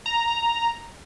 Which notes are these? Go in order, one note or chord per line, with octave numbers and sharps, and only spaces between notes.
A#5